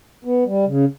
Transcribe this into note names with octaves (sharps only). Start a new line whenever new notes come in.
B3
G3
C#3